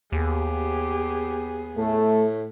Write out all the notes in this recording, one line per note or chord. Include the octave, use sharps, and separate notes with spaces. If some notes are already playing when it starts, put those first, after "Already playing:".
D#2 B3 G4 G#4
A2 A3